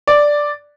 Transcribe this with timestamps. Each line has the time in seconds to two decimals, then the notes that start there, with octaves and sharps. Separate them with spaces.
0.07 D5